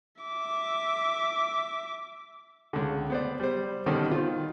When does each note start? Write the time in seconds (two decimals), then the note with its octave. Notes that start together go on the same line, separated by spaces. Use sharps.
0.22 E5 D6
2.73 C#2 D3
3.10 B3 C5 D5
3.40 G3 C5
3.86 B2 D3 D#3 G3 C4 C#4
4.12 D#3 F4